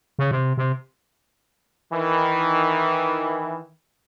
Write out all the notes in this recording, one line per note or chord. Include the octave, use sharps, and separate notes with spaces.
C#3
C3
C3
D#3 E3